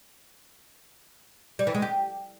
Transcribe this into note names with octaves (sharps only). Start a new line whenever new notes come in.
G3
E3
G#3
G4